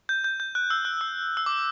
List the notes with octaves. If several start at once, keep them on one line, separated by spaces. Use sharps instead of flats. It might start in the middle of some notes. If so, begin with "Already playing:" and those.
G6
G6
G6
F#6
E6
F#6
E6
E6
D6